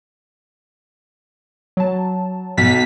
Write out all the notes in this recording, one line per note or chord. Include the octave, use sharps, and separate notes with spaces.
F#3 A5
B1 A6 B6